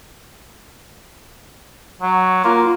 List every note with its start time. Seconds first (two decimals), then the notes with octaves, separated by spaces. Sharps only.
2.01 F#3
2.44 A#3 F4